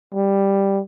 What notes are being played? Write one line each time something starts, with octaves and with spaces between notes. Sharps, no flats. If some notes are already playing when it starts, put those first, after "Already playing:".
G3